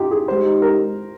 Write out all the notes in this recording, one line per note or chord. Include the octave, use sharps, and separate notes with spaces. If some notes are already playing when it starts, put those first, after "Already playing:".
Already playing: D#4 F4 G4
G#4
G#3 D#4 G4 C5
A#4